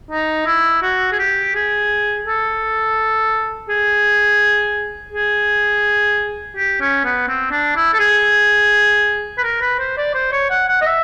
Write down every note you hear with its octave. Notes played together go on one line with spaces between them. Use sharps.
D#4
E4
F#4
G#4
G4
G#4
A4
G#4
G#4
G4
C#4
B3
C4
D4
E4
A4
G#4
B4
A#4
B4
C5
D5
C5
C#5
F#5
F#5
D#5
E5